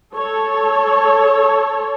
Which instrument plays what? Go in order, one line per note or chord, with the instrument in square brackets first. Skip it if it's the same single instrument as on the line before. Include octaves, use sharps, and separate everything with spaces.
[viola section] A4 C#5